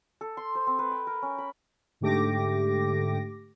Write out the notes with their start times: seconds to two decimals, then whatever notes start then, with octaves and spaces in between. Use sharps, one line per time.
0.21 A4
0.37 C6
0.55 C5
0.67 C4
0.79 B4
0.91 G5
1.07 A#4
1.22 C#4
1.38 B5
2.01 G#2 D3 A3 G4 D6 A#6